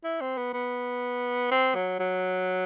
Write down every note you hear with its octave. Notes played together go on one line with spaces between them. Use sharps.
E4
C4
B3
B3
C4
F#3
F#3